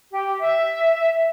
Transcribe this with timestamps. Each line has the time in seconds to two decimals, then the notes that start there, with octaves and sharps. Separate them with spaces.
0.12 G4
0.40 E5